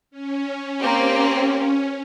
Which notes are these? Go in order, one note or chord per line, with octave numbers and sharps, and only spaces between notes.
C#4
A#3 C4 G4